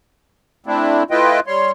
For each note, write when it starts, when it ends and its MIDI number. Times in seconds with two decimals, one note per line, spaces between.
0.66 1.03 57
0.66 1.03 60
0.66 1.03 62
0.66 1.03 64
1.11 1.40 57
1.11 1.40 64
1.11 1.40 65
1.11 1.40 71
1.11 1.40 75
1.11 1.40 79
1.47 1.71 55
1.47 1.71 73
1.47 1.71 84